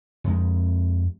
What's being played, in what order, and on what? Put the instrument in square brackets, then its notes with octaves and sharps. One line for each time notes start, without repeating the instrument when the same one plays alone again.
[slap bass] F2 G#3